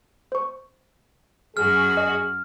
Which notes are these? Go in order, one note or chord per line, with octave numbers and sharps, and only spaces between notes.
C5 C#6
F#2 F#4 G#4 F6
D#5